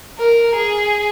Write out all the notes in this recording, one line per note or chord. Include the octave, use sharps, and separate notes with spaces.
A#4
G#4